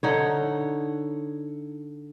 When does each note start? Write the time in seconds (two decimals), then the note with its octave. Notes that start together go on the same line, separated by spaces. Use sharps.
0.03 D3 D#4 C#5